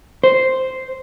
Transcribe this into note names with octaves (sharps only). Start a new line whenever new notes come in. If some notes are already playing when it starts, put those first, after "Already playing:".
C5